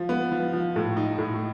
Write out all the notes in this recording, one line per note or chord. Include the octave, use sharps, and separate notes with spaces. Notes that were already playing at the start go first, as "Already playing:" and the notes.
Already playing: F3
B3
F3
F3
A2
D#4
A2